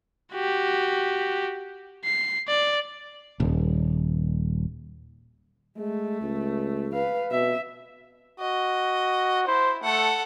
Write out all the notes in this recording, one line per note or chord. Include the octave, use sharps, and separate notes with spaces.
F#4 G4
C7
D5
D#1
G#3 A3
C#2
B4 F5
B2 E5
F#4 D#5
E4 C5
A3 A4 F#5